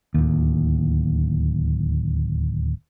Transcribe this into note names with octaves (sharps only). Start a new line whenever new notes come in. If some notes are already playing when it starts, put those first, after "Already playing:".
D1 D#2